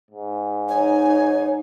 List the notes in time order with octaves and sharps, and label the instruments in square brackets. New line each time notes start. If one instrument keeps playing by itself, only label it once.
[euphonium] G#2
[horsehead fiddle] D#4 [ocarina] C#5 [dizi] G#5